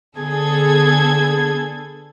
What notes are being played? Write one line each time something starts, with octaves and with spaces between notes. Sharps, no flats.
D3 B3 G#4 A4 G#6